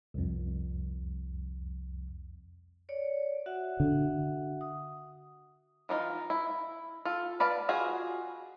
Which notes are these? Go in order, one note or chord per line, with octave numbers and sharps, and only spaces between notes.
C2 F2
C#5 D5
F#4 E5 F#5
D3
D#6
E3 D4 D#4 F4
E4
F4 A4
B4 D5 F5 A5
F4 F#4 G#4